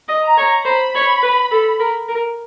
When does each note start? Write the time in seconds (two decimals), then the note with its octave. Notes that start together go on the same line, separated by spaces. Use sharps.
0.09 D#5
0.23 A#5
0.37 C#5
0.66 C5 B5
0.95 C#5
1.23 B4
1.51 A4
1.80 A#4
2.08 A#4